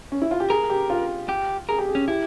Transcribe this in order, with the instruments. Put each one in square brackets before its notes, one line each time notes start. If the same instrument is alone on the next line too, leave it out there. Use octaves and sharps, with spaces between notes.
[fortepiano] C#4
E4
F4
G4
[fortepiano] G#4 [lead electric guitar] A#4
[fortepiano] G4
F4
[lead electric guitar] G4
[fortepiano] G#4 [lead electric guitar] A#4
[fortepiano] G4
G#4
[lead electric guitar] C#4
[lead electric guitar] E4 [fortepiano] G4